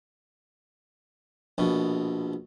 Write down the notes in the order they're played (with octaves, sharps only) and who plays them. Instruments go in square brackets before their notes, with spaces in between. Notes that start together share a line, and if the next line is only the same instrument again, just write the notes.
[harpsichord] A#1 B2